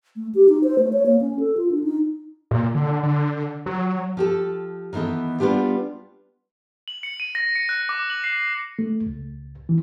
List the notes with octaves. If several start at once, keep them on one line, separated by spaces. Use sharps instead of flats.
A3
G4
D#4
C5
A3
C#5
A#3
C#4
A4
F4
D4
D#4
A#2
D3
D3
F#3
F3 G4 A4
D#3 E3 B3 D#4 A4
G3 B3 D4 F4 G4
F#7
C#7
D#7
A#6
C#7
F#6
D6
F#7
C7
A3
C#2
E3